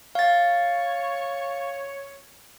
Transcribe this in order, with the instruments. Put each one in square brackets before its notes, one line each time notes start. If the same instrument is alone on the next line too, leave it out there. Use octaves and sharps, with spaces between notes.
[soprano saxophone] C#5 [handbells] F5 A6